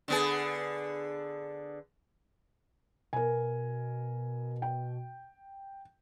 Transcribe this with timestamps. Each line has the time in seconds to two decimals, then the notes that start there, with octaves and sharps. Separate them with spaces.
0.08 D3 B3 G#4
3.13 B2 A#4 G#5
4.62 G5